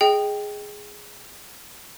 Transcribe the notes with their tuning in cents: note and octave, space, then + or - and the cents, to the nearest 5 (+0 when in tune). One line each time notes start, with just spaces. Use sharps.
G#4 +0 D#5 +0 G5 +0